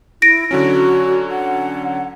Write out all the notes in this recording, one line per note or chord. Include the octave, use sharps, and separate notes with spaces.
E4 A#6 D7
D3 F#3 C#4 F#4
F#5